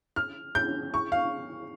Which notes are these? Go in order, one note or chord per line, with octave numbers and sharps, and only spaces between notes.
F6
G6
C#6
F5